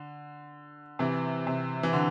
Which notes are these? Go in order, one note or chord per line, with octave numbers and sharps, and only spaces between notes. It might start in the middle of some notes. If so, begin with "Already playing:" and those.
Already playing: D3
C3 E3
C3
E3
D3